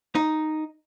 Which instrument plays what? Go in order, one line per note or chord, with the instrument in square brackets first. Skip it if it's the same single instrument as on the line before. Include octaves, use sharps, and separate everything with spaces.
[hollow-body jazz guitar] D#4